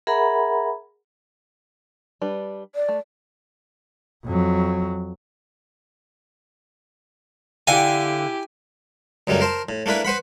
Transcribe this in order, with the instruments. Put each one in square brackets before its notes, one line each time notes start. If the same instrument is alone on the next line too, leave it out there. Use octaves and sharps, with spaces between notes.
[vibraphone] G#4 A#4 E5 F#5 A#5 B5
[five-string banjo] G3 D4 B4
[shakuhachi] D5
[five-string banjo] A3
[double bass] F2 F#3
[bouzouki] D3 F5 G5 [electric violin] E4 G4 [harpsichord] G#5
[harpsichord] C#2 F#2 G3 A3 A#3
A#4 C5 A5
A2
A3 A#3 D4 E4 B4
B4 C5 F#5 B5